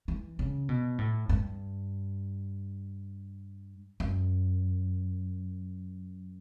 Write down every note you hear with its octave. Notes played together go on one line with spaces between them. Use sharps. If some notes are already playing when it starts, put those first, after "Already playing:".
E3
C#3
B2
A2
G2
F#2